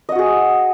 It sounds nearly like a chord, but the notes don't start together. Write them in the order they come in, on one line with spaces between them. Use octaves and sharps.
D#5 F#5 F#4 G#4